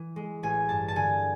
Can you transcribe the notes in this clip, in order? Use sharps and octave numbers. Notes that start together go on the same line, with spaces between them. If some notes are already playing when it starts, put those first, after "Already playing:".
Already playing: E3
G#3
A1 G#5
G2 A5
A5
D3 G#5